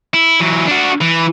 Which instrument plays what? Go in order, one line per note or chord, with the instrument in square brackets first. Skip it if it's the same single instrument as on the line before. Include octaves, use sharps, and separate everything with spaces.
[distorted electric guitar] E4
E3 F#3
D4 F#4
E3